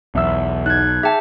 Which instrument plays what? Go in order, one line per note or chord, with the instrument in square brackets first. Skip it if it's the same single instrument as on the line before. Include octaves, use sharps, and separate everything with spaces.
[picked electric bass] B1 [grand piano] E2 E5 E6
[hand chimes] D#4 [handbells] F#6 G#6
[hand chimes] G#4 G5 [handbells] E5 A5